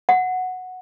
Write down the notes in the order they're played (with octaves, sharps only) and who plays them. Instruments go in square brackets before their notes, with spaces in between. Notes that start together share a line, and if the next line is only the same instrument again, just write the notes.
[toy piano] F#5